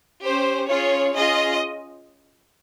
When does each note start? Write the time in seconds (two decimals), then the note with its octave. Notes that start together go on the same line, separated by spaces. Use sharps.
0.24 C#4 G4 C5
0.69 C#4 F4 G#4 C#5
1.14 C#4 F4 G#4 D#5